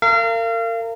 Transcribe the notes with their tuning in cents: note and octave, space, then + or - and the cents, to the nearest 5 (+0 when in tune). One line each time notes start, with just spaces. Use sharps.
A#4 -35 F5 -30